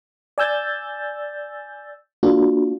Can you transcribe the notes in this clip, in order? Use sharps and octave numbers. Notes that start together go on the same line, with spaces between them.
D5 G#5 E6 G6 A6
A#3 D4 F4 F#4